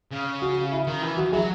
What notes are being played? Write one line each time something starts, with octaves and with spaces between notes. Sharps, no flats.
C#3
F#4
E4
D#3
E3
F#4
F#3 E4 G#4